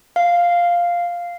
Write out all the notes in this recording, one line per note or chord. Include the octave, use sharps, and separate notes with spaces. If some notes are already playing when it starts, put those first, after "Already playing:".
F5